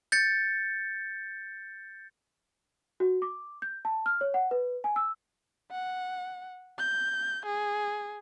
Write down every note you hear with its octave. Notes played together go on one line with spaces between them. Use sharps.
G6 A6 C#7
F#4
D6
G6
A5
F6
C#5
F#5
B4
G#5
E6
F#5
G6
G#4